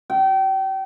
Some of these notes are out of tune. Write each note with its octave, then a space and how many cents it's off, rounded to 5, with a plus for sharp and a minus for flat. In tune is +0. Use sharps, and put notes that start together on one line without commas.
G5 -30